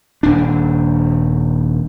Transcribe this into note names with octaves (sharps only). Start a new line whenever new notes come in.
D#1 D4